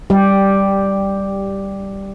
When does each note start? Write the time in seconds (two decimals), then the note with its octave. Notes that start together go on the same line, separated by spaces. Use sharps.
0.10 G3 G4